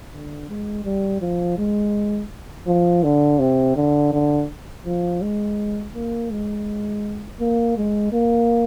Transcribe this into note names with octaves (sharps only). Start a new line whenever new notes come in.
D3
G#3
G3
F3
G#3
F3
D3
C3
D3
D3
F3
G#3
A#3
G#3
A#3
G#3
A#3